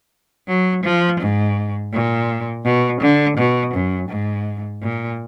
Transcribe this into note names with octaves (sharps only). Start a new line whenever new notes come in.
F#3
F3
G#2
A#2
B2
D3
B2
F#2
G#2
A#2